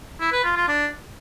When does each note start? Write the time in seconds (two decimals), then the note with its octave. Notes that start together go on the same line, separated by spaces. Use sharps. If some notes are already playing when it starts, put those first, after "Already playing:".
0.21 E4
0.32 B4
0.44 F4
0.56 F4
0.68 D4